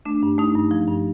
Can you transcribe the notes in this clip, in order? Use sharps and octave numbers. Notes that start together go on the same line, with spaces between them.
A3 D4
G2
A3 D#4
G2
F3
G2